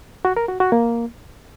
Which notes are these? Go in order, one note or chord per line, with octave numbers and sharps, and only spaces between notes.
F#4
A#4
F#4
F#4
A#3